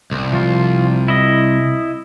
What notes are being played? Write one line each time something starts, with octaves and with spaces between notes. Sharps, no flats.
C2
F3 F4
E4 D#5